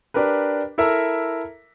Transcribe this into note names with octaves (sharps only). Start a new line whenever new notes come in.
D4 G4 A#4 B4
E4 A4 A#4 E5 A#5